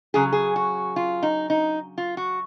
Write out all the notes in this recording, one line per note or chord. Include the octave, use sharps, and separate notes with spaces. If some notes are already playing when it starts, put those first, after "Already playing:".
C#3 F#3 G#4
G#4
F#4
F4
D#4
D#4
F4
F#4